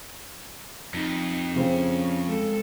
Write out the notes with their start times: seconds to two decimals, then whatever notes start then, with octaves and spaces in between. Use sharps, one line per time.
0.94 F2 D#4
1.56 C#3 F3 C4 C#4
2.27 G#3 A4